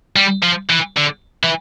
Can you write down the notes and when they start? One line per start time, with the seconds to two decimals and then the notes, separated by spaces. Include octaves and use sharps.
0.16 G3
0.43 F3
0.70 E3
0.97 D3
1.43 E3